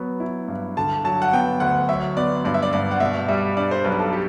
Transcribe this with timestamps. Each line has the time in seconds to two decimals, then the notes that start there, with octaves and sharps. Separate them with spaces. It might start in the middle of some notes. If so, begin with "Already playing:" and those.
Already playing: F#3 B3
0.20 E4
0.48 G2
0.77 D3 A5
1.04 F#3 A5
1.22 F#5
1.33 B3 G5
1.60 D2 F#5
1.89 F#3 E5
2.17 B3 D5
2.45 G2 D5
2.54 E5
2.63 D5
2.73 G2 D5
2.91 F#5
3.00 B2 E5
3.28 G3 E5
3.56 D4 D5
3.71 C5
3.84 B1 B4
3.99 A4
4.13 G4